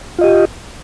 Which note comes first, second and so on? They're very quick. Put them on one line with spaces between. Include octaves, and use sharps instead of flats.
F4 D#5 G4